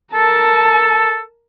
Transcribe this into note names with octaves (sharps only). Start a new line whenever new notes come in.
A4 A#4 A5